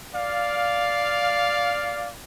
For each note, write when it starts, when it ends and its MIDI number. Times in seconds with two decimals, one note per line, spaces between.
0.14 2.09 74
0.14 2.09 77